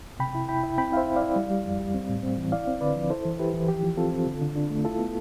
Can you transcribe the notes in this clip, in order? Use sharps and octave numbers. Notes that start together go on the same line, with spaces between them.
C3 G5 B5
E4
E4 G5 B5
E4
C4 G5 B5
E4 C5 E5 F5
E4
D5 F5
E4
G3
G3
F2
G3
C4
A2
C4
E3
E4 D5 F5
C4
D3 B4 D5
F3
E4 A4 C5
E3
E4 G4 B4
E3
F3 G4
F3
C4 F4 A4
C4
D3
D3
D4
A3
E4 F4 A4
B3